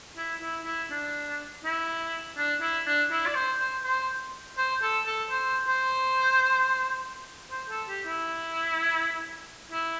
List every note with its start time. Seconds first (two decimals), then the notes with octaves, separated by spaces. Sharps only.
0.17 E4
0.41 E4
0.65 E4
0.91 D4
1.64 E4
2.37 D4
2.61 E4
2.86 D4
3.11 E4
3.26 D5
3.35 C5
3.59 C5
3.84 C5
4.57 C5
4.82 A4
5.06 A4
5.30 C5
5.68 C5
7.51 C5
7.70 A4
7.88 G4
8.06 E4
9.72 E4